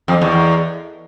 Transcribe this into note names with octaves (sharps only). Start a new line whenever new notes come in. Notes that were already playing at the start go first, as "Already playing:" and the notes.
F2
E2